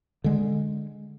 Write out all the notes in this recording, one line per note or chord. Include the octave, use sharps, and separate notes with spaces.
D3 G#3